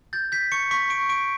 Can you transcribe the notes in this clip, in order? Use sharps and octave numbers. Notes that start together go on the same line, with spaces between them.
G6 A6
G6 B6
C#6 C#7
C#6 B6
C#6 D7
C#6 D7